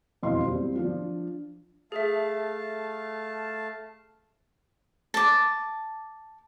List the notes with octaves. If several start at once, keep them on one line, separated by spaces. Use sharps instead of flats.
E1 F2 E4 D#5 F5 C6
G3 C4
F3 D4 F4
A3 G#4 E5 F5 A5
A5 D6